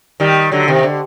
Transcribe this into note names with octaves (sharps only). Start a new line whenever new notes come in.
D#3 G3
D3 F#3
C3 D#3
D3